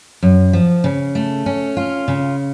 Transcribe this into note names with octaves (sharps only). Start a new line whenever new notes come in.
F#2
F3
C#3
A3
C#4
F4
C#3